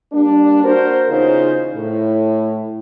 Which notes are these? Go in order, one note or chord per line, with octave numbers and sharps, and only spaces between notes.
G3 A#3 D4
A#3 F#4 A#4 C5
E2 C#3 D#4 F4 C5
A2